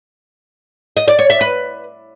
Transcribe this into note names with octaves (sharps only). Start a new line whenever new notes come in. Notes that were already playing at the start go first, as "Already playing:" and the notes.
D#5
D5
C#5
E5
B4